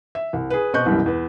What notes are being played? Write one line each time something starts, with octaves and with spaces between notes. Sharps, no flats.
E5
C2
G#4 B4
B2 C4 D#5 C#6 F#6 G6
C2 F#2 B2 E3 G3
E2 B4